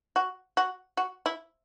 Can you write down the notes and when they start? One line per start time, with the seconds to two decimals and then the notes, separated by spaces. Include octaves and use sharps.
0.16 F#4
0.57 F#4
0.97 F#4
1.26 E4